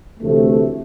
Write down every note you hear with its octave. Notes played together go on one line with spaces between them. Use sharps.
D2 C3 E3 A3